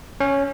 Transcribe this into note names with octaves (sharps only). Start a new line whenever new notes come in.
C#4